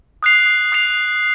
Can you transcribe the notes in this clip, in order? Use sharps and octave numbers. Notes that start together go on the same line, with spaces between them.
D#6 F#6 C7 F7
D#6 F#6 C7 F7